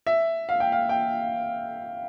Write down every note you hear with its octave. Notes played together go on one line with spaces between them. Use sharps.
E5
F5
G5
F5
G5